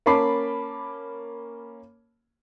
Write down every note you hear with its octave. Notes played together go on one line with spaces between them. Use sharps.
A#3 C#4 A5 B5 D6 C7